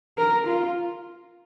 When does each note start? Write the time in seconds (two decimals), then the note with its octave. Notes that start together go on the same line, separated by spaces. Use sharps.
0.18 A#4
0.46 F4